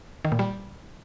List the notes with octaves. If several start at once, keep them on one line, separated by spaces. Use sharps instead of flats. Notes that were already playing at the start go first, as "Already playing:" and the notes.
D#3
A#2
G3